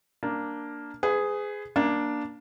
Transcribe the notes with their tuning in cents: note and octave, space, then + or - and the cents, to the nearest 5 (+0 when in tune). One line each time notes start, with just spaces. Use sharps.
A#3 +0 D4 +0
G#4 +0 B4 +35
A#3 +15 D4 +0